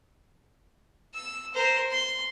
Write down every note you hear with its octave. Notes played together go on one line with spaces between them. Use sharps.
E6
A#4 C5
C6